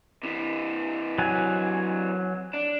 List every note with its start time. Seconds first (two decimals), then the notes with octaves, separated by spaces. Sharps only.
0.23 C3 E3
1.18 F#3 G#5
2.54 D4